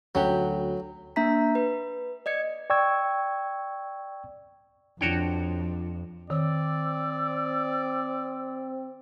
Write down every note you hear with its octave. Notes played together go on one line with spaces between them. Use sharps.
D2 F#3 C#4 F#4 G4
A#3 D4 E5 A#5 B6
B4
D5 D#5 G#6 C#7
D5 G5 C#6 E6 G#6
F2 F3 D4 F#4 C#5 G5
D#3 C4 D5 E6